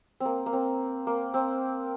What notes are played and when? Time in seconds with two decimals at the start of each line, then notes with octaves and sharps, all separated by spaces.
0.20 C4
0.25 A#3
0.46 A#3
0.53 C4
1.07 A#3
1.34 C4